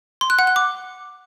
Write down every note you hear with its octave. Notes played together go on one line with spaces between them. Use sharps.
C6
F#6
F#5
F#6
D6